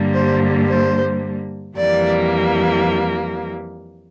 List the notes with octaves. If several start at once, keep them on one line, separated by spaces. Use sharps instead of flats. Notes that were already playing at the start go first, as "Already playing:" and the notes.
Already playing: G2 D3 G3 A#3
C5
C5
F2 E3 G3 A#3 D5